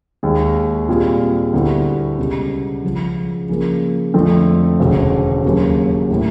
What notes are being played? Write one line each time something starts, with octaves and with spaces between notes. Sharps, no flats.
D#2 D#3 G#3
A#2 G3 C4 F4 G#4
D2 D3 G3 B3 E4
C#2 B2 G3
C#2 C#3 F3
C#3 F3 A#3
F2 D3 F3 A3 C4
E1 D2 C#3
D#2 C#3 F#3 A#3
A2 E3 G3 A#3